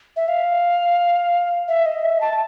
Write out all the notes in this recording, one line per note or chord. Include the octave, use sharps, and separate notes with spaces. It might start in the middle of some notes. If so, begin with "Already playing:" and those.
E5
F5
E5
D#5
E5
A5